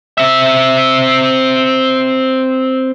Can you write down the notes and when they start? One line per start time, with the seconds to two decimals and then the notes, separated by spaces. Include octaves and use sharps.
0.18 C4 E5